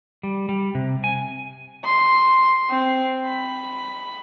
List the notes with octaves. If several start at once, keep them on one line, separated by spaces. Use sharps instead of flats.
G3
G3
C3
G#5
C6
C4
B5